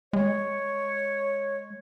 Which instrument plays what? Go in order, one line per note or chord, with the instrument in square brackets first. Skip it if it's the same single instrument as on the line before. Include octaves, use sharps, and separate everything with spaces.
[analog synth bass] G#3 [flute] C#5